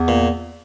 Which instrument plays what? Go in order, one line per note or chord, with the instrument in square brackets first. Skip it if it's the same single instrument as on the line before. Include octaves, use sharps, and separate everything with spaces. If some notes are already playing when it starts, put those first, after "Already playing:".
Already playing: [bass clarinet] E2
[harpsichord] A#2